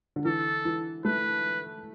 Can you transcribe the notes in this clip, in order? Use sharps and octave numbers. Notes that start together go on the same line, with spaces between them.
D3
E3 A4
E3
A3 B4